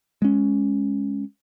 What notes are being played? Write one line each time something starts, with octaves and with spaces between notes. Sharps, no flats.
G#3 C#4